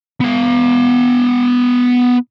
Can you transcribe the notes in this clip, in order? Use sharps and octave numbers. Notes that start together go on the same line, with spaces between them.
B3 F5